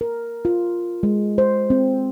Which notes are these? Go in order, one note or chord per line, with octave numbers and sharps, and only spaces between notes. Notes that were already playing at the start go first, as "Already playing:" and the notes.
A#4
F4
G#3
C5
C4